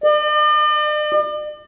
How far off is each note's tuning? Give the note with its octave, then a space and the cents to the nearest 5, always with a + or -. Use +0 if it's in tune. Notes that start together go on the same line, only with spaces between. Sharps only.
D5 +45